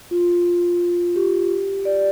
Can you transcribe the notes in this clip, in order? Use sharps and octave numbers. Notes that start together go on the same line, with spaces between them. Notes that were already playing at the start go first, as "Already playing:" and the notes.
F4
G4
D5